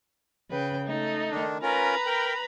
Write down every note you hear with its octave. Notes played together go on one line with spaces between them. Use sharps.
C#3 B4 G5
A3 D#4
D#3 D4
C#4 F4 A#4 B4 A#5 B5
A#4 G5